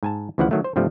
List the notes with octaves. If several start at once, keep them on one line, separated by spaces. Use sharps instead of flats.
G#2 G#5 A5
D2 C#3 E3 F3 E4 F#5
D#3 F#3 A3
C5
G2 C3 F3 G3 A3